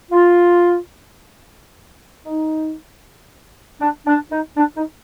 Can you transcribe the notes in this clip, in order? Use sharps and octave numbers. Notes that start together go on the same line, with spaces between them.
F4
D#4
D4
D4
D#4
D4
D#4